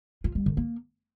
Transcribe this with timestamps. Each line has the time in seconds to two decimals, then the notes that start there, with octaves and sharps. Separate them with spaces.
0.24 F4
0.35 G3
0.46 D3
0.57 A#3